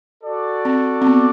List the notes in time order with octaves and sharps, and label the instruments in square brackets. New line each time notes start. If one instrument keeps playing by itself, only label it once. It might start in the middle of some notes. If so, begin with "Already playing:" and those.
[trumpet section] F#4 A4 D5
[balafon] C4
C4
B3